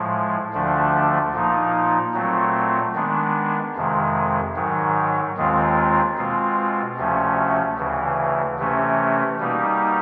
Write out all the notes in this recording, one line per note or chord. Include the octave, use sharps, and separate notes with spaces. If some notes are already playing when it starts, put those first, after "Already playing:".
Already playing: A2 F3 G#3
D2 D3 F3 A3 D4
A#2 F3 A#3 D#4
A#2 F#3 A3 C4
D#3 G#3 B3 D4
F2 C3 D#3 G#3
G#2 D#3 F#3
D#2 D#3 G#3 C4 F4
B2 G#3 C4 F4
D2 C3 F3 A3 C#4
D2 C#3 E3
C3 E3 A3 C#4
B2 G3 A#3 D#4